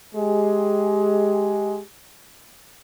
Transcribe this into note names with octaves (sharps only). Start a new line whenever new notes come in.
G#3 G4